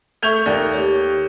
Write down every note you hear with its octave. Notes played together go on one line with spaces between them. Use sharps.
A3 A4 C#6 G6 G#6 F7
D#2 A#3 D5
G4 C#5